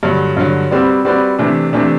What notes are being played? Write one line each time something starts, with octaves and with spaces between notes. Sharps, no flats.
G2 D3 F#3
G2 D3 F#3
G3 C4 F#4 B4 D5
G3 C4 F#4 B4 D5
C3 E3 A3 D4
C3 E3 A3 D4